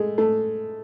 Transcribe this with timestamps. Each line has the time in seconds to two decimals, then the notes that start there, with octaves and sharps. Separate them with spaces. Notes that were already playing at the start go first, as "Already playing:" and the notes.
Already playing: G#3 A3
0.18 A3